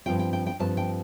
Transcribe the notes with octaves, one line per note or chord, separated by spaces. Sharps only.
G2 F3 C4 F4 G5
G5
G5
G5
G2 F3 C4 F4 A5
G5